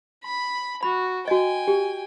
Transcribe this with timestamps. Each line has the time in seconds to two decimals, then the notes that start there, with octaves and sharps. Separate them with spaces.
0.24 B5
0.83 F#4 B5
1.28 F#4 D#5 G5 G#5
1.68 G4